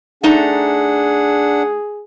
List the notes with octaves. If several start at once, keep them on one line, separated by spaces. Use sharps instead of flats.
A3 D4 D#4 G#4 F#5 A#5